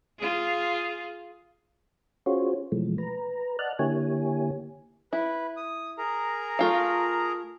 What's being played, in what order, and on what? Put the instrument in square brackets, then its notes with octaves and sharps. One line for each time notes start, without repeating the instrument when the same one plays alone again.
[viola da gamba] F4 G#4
[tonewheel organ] C#4 F4 F#4 G#4 C5 C#5
B2 E3 F3 G#3 A3
B4 A#5
D5 D#5 F#5 A5 F6 F#6
D3 A#3 E4 G4 C#5 G#5
[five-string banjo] E4 [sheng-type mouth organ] B4
[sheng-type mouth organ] D#6
G#4 A#4 A#5
[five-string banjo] A3 F4 F5